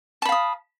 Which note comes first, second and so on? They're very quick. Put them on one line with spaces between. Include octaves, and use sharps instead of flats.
A5 B5 F5 D#6